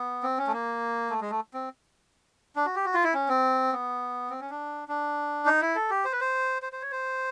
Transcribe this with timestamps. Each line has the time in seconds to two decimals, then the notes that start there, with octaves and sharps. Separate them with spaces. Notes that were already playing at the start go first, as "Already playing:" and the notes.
Already playing: B3
0.23 C4
0.38 C#4
0.47 A3
0.53 A#3
1.10 A3
1.21 G#3
1.30 A3
1.54 C4
2.56 D4
2.65 F#4
2.75 G4
2.85 F#4
2.94 F4
3.04 E4
3.14 C#4
3.29 C4
3.72 B3
4.30 C4
4.40 C#4
4.50 D4
4.88 D4
5.46 D#4
5.61 E4
5.75 A4
5.90 G4
6.05 C5
6.12 B4
6.21 C5
6.62 C5
6.73 C5
6.82 C#5
6.92 C5